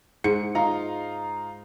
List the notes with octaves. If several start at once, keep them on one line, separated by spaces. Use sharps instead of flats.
G#2 C#7
D#4 F4 A#5